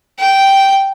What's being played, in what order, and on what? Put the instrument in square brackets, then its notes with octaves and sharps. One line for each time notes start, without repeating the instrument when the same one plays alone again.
[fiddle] G5